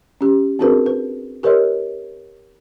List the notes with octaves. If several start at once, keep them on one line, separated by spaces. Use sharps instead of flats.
C#4 G4
C4 D4 F#4 G#4 A#4 B4
B4
G4 A#4 B4 C#5 D#5 C6